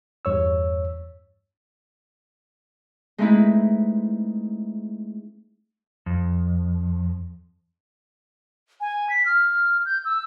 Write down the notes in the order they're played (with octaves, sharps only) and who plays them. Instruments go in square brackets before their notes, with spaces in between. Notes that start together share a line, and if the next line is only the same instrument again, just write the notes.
[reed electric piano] E2 G2 C#5 E6
[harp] G#3 A3 C4 D#4 E4 B4
[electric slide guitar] F2
[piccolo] G#5
B6
F6
G6
E6